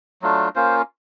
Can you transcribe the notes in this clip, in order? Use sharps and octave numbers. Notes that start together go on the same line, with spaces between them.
F#3 A3 D4 F4
A#3 C#4 F4 C5